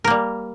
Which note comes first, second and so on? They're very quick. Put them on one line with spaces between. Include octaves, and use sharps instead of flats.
A#4 A#3 G3